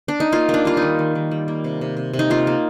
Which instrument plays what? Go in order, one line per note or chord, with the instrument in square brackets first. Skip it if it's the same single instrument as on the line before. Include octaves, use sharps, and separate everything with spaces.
[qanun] D4
D#4
A#3 F4
A#3
D4
G3 F4
D#4
D#3
D#3
D#3
G3
A#3
C3
C3
C3
C3
D#4
A#3 F4
A#3